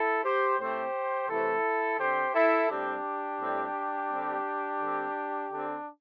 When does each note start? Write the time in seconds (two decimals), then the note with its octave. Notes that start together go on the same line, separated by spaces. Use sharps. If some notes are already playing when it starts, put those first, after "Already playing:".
Already playing: E4 A4
0.24 G4 C5
0.59 A2 A3 C4 G4 C5
1.29 C3 E3 A3 C4 E4 A4
1.99 D3 C4 G4 C5
2.35 E4 A4
2.70 A2 G3 C4 D4 G4
3.40 A2 G3 C4
4.11 D3 G3 C4
4.81 D3 G3 C4
5.51 D3 C4 D4